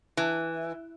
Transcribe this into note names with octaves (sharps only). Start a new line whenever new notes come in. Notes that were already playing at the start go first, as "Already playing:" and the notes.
E3